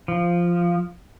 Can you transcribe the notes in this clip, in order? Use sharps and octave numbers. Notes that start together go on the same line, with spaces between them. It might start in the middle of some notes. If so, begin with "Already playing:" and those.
F3